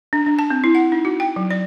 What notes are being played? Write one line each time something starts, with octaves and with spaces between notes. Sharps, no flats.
D4
D4
A5
C4
E4
F#5
D#4
F#4
G5
F#3
D5